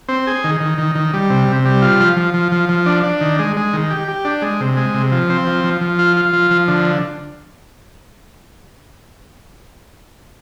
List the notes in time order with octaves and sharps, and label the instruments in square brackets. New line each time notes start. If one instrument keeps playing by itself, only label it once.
[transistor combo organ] C4
G#4
D#3
D#3
D#3
D#3
G3
C3
C3
G3
F4
F3
F3
F3
F3
F3
D4
D4
D#3
G#3
G#3
D#3
G4
G4
D4
G#3
C3
G#3
C3
F3
C4
F3
F3
F3
F4
F4
F3
F3
D3